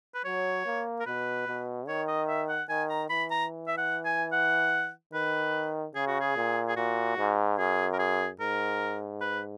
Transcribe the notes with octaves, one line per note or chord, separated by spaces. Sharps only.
B4
F#3 C#5
A#3
A#4
B2 B4
B2
D#3 C#5
D#5
E5
F#5
D#3 G#5
A#5
E3 B5
A#5
E5
F#5
G#5
F#5
D#3 B4
C#3 G#4
F#4
G#4
A#2
G#4
A#2 F#4
G#2
F#2 G#4
A#4
G#4
G#2 A#4
B4